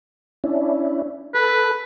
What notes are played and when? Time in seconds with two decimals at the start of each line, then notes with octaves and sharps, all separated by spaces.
0.44 C#4 D4 E4
1.34 A4 B4